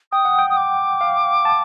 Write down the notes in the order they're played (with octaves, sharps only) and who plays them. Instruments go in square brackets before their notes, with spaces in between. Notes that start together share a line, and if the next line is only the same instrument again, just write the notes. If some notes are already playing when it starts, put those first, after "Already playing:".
[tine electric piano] G5 [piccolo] D#6
[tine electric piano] F#5
G5
[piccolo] D#6
D6
[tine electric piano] F5
A5